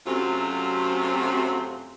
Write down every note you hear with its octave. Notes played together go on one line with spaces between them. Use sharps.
F#2 C3 F#3 A3 C4 F4